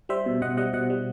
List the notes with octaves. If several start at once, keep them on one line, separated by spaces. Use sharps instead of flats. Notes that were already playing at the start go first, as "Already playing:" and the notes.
G3 C5 E5
B2
B2 D#5 F#5
G3 D#5 F#5
B2 D#5 F#5
G3